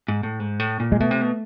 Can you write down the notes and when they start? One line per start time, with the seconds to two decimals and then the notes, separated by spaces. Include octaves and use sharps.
0.08 G#2
0.23 A2
0.40 G#2
0.60 A2
0.80 A#2
0.92 G#3
1.00 B2 A3
1.11 C3
1.21 B2